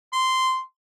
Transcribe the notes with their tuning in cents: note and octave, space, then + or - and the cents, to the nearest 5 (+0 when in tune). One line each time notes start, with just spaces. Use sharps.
C6 -10